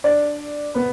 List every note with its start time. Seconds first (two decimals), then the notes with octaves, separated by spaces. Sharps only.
0.04 D4 D5
0.75 B3 B4